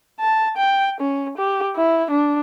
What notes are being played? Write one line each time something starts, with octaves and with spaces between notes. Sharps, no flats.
A5
G5
C#4
G4
E4
D4